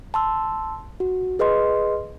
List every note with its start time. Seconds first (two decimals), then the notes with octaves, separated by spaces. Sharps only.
0.14 A5 C6 E6
1.00 F#4
1.39 G#4 B4 D#5 C6